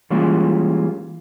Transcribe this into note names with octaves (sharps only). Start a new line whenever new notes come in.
E3 G3 G#3 A#3 C#4 F4